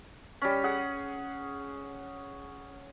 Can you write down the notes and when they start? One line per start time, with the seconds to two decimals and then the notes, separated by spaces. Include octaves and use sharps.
0.42 G3 C#4
0.64 G#4 F#5